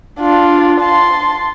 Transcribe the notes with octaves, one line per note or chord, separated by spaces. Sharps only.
D4 F4
A5 C6